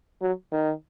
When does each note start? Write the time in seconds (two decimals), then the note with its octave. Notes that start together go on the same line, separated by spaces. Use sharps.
0.21 F#3
0.53 D#3